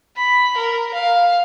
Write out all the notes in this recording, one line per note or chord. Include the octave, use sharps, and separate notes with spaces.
B5
A#4
F5